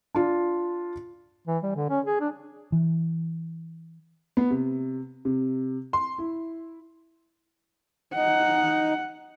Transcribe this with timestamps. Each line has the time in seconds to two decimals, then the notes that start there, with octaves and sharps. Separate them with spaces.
0.15 D4 F4
1.47 E3
1.63 G3
1.76 D3
1.90 C#4
2.05 G#4
2.20 D4
2.72 E3
4.37 B3
4.51 C3
5.25 C3
5.93 C6
6.18 E4
8.15 D#4 F#5